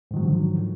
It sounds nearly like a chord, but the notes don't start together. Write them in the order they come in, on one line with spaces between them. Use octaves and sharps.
G#2 D#3 F#3 F3 D3